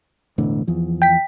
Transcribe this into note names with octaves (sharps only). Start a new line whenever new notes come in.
E1 A2 D3
E2 F3
G5 B6